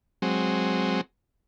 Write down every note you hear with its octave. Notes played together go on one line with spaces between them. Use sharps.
F#3 G#3 C4